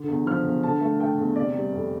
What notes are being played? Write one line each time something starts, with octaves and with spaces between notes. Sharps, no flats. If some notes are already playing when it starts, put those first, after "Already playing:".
Already playing: D3
E2
F3 F6
E2
D3 A5
A3
A3 G5
E2
C3 D5
G3
F2